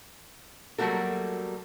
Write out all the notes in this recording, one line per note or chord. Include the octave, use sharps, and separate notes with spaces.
F#3 G3 A3 A#3 F#4 A4